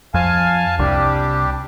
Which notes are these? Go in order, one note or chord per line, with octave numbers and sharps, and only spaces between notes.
F2 F5 G#5 A5
C2 G3 D4 G4